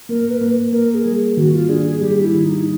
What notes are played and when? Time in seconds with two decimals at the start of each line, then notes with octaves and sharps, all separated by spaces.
0.09 A#3 A#4
0.30 B4
0.41 A#3
0.73 A#3 A#4
0.94 G#4
1.05 G3
1.37 D#3 F#4
1.53 F4
1.69 D4 G#4
1.86 G#4
2.01 G3 G4
2.22 E4
2.34 D#3
2.44 D#4